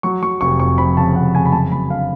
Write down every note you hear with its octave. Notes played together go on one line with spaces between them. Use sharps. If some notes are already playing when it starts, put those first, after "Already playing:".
F#3 C#6
F#3 C#6
F1 C#6
F2 C#6
F2 B5
C#3 A5
F1 F#5
C#3 G#5
B5
F#2 A5
F#2 B5
D3 F5